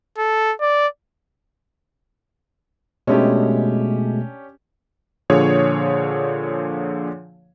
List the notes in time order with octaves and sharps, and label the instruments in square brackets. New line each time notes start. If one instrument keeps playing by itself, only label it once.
[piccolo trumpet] A4
D5
[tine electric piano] B2 G#3 A3 [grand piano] C#4 D4 G4
[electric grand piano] A#2 D3 F3 G#4 C#5